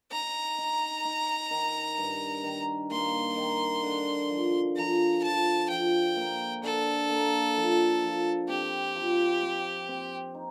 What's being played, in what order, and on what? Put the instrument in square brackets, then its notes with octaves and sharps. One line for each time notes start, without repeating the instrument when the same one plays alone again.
[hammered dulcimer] D#4 [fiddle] A#5
[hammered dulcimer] D#4
D#4
D#3
G2
D#3
[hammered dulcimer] A#3 [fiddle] C6
[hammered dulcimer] D#3
D3
F3
[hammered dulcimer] F3 [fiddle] A#5
[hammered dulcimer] F3 [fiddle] A5
[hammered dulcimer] F3 [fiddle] G5
[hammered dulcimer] A#3
[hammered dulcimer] D3 [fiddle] A4
[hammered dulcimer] A#3
F3
F3
[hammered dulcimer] C4 [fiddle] G4
[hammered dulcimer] F3
C4
C4
D#4